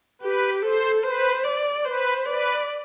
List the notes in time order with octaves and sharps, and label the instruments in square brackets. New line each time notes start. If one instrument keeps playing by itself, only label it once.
[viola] G4 [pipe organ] B4
[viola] A4 [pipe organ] C5
[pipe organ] B4 [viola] C5
[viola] D5
[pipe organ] B4 [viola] C5
[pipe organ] B4 [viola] D5